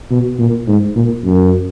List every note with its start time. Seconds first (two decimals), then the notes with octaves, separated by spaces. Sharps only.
0.11 B2
0.39 A#2
0.67 G#2
0.96 A#2
1.25 F#2